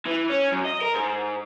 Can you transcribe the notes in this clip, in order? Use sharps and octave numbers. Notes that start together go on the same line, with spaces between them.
E3
C#4
F#2
D#5
A#4
G#2